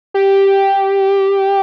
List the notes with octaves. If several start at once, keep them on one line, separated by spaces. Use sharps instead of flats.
G4